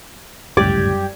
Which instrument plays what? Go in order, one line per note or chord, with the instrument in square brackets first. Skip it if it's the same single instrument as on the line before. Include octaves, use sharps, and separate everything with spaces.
[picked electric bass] G1 C#2 A2 [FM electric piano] F#2 G3 G#6 [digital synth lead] G4 [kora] D5